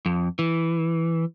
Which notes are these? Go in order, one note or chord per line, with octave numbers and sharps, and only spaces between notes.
F2
E3